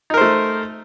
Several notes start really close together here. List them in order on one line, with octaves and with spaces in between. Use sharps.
D#4 A#4 C5 A3